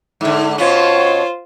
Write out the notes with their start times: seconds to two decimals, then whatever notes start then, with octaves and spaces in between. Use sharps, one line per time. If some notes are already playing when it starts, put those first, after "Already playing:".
0.21 G#2 D3
0.58 B2 C#4 F4 C5 C#5